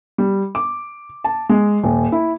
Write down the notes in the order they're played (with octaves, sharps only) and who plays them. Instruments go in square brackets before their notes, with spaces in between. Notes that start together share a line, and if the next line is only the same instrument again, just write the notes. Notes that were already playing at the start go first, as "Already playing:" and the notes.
[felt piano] G3
D6
A5
G#3
D#1
E4